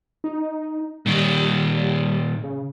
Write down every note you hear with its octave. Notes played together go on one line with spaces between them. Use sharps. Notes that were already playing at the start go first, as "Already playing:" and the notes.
D#4
A#2 D#3 G3
C#3